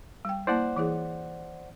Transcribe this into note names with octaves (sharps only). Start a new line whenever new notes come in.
G3 G5
A#3 E4 C5 D5 F#5
E3 E4 G#4